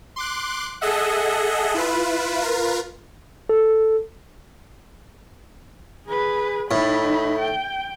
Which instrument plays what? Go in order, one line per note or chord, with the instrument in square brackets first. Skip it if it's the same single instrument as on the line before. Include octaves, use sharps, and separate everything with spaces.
[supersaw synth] C6 D6 F#6
G#4 A4 D#5 E5 F#5
E4 F4 B4
F4 A#4 B4
[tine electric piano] A4
[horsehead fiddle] G#4 B4
[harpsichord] A2 [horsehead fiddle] D#4 B5
[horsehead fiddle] G5